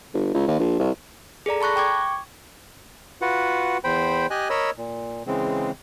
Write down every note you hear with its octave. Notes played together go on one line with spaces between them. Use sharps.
G1
C#2
D#2
A#1
C2
G#4 A4 D5 A#5
A5 B5 C#6 F#6 A#6
G5 C#6 D6 G#6
F4 F#4 B4 F#5
E2 C5 G5 B5
G4 D#5 G#5 F#6
A#4 C#5 D#5 B5 E6
A#2
C#3 E3 G#3 C4